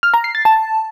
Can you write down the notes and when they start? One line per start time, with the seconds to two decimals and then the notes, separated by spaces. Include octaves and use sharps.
0.03 F6
0.14 A#5
0.24 C7
0.35 A6
0.45 A5